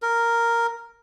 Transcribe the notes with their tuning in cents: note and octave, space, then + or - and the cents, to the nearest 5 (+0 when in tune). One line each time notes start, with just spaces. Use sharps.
A#4 -5